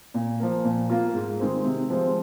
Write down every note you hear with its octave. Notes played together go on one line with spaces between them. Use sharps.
A#2
F3 A#3
A#2
A#3 F4
G#2
D#3 G#3 C4
C3
F3 G#3 C4